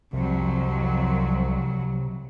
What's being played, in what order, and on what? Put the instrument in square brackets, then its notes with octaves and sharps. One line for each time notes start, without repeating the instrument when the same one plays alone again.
[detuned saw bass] C2 [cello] F2 F#3 [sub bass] C3